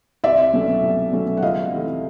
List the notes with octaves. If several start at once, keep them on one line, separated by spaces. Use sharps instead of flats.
C2 D5 E5
B2 F#3 A3 C#4
C2
B2 F#3 A3 C#4
F#5
C#2 D#5 F5
C3 E3 A3